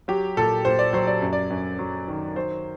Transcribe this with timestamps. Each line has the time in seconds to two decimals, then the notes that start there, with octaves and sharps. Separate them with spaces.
0.08 F#3 G4
0.37 A#2 A4
0.65 A#2 C5
0.79 D5
0.93 F#3 C5
1.07 D5
1.21 F#2
1.33 D5
1.50 F#2
1.79 F#3
2.08 D#3
2.35 F#3 C5